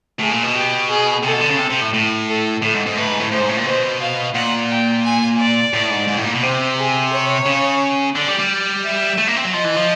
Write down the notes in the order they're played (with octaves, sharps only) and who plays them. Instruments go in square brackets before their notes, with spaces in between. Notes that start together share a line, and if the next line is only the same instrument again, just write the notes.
[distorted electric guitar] A2 [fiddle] G#4
[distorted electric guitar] A#2
B2
[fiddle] G4
G#4
[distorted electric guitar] C3 [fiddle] A4
[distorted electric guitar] B2
D3
C#3
C3
C3
A2
A2
[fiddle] A4
[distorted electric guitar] A2 [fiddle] A4
[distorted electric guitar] G#2
G#2
[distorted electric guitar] A2 [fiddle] B4
[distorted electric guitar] G#2
A2
[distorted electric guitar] A2 [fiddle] C5
[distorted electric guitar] G#2
A2
A#2
[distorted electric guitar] B2 [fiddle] C5
[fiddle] F5
[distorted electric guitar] A#2 [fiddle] F#5
[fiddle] G5
G#5
D5
[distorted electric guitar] A2
G#2
G#2
A2
A#2
B2
[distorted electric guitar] C3 [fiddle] C5
[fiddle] G#4
C#5
[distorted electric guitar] C#3
[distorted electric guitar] D3 [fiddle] D5
[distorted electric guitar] G3
G3
[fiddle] E5
[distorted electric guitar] A3
A#3
C4
F#3
[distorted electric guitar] F3 [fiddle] D#5
[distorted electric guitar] E3
F3